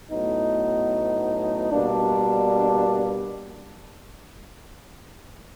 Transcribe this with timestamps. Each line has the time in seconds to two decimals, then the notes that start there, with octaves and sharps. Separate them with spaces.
0.10 A2 F#3 B3 D#4
1.71 B2 G3 A#3 D4